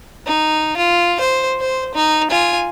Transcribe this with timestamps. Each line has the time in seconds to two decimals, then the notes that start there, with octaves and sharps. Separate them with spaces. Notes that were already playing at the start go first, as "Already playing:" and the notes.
0.26 D#4
0.77 F4
1.20 C5
1.60 C5
1.95 D#4
2.30 F4 G#5